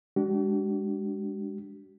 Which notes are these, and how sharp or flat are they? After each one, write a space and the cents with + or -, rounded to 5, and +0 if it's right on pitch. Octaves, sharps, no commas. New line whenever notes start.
G#3 -20 D4 +0 F#4 +45